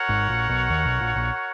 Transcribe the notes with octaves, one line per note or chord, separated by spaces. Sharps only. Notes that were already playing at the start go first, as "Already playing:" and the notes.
Already playing: F#4 A#4 C#5 F#5
G#1 G#2
A#1 A#2
B1 B2
D#2 D#3
B1 B2
A#1 A#2
A#1 A#2